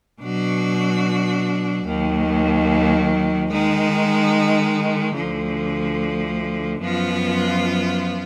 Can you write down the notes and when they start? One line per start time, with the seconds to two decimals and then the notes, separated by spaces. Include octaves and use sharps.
0.21 B2 F#3 D4 F#4
1.86 D#2 D#3 F#3
3.50 D#3 G#3 D#4
5.15 D2 D3 F3
6.81 F#2 F3 B3 F4